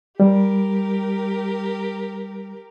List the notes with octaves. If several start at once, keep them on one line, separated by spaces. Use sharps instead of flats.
G3 G4 A#4